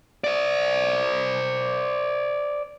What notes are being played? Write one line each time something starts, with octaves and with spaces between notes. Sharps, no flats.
C5 D5